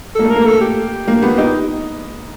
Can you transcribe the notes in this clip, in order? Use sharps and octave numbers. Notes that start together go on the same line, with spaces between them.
A#3 A4
A3 A#4
A#3
A4
G4
A#3
B3
D#4 G4